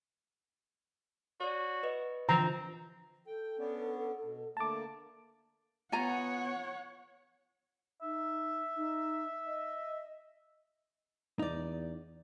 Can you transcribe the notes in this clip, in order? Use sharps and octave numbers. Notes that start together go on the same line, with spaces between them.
F#4 C#5 D5
B4 D#5
D3 E3 F3 C4 A#5
A4 G5
B3 C#4 D4
B2
D3 A3 A#3 A5 D6
B3 F4 C#5 F#5 G#5 A#5
D#4 E5
D#4
D#5
E2 D#4 D5